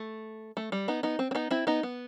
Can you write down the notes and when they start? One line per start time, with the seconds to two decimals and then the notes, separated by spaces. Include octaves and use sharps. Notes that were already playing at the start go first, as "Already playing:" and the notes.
Already playing: A3
0.57 A3
0.72 G3
0.88 B3 D#4
1.03 B3 D#4
1.19 C4
1.31 C4
1.35 B3 D#4
1.51 C4 E4
1.67 B3 D#4
1.83 B3